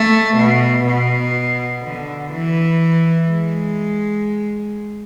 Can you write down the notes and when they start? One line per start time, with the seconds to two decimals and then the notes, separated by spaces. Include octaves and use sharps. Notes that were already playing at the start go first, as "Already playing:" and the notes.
Already playing: A3
0.36 B2
0.86 B2
1.83 D3
2.32 E3
3.29 G#3